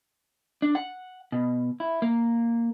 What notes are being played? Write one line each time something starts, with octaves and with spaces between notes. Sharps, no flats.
D4
F#5
B2
E4
A#3